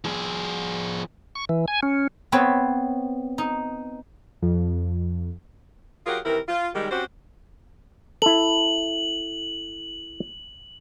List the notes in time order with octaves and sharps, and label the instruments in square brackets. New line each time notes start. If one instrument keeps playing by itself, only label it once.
[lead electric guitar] F3 G#4
[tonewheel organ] C#6
E3
G#5
C#4
[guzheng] B3 C4 B4 C#5
D#4
[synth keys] F2
[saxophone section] F#3 F4 G4 G#4 A#4 F#5
C3 D#3 E3 E4 A#4
F4
D#3 G3 G#3
C4 C#4 F#4 G4 C5
[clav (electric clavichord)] E4 A4 [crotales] F#7